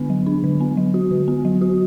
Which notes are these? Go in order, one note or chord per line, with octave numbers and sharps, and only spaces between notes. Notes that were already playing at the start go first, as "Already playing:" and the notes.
Already playing: D3 B3 D4
F#3
D4
D3
B3
F#3
F#4
D3
B3
F#3
F#4